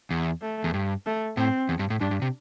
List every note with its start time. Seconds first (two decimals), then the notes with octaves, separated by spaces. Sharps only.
0.11 E2
0.41 A3
0.64 E2
0.74 G2
1.06 A3
1.37 A2 C4
1.69 E2
1.79 G2
1.90 A2
2.00 G2 D4
2.11 G2
2.22 C3